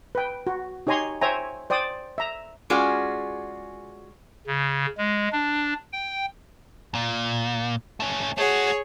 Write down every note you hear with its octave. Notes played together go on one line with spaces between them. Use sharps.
B4 G5
F#4
D#4 G4 C#5 G#5 A#5 C6
C5 C#5 E5 G5 G#5 A#5
C5 D5 G5 D#6
E5 A#5
G#3 C#4 F4 F#4 G#4 D5
C#3
G#3
D4
G5
A#2
A3 C#4
A3 F#4 G#4 C#5